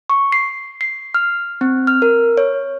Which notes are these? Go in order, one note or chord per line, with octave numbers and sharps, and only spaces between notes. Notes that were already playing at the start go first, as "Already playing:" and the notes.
C#6
C7
C7
F6
C4
F6
A#4
C#5